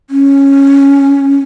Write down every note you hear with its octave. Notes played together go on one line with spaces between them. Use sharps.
C#4